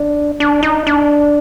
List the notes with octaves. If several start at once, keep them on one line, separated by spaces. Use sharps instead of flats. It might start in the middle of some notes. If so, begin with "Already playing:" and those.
Already playing: D4
D4
D#4
D4